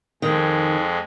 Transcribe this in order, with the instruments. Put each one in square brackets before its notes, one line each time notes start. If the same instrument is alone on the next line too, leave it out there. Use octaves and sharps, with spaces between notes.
[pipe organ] F2 G#3 [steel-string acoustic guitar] D#3